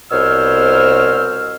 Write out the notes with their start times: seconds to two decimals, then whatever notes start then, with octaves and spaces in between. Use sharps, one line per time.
0.12 C2 B2 C5 C#5 E6 F6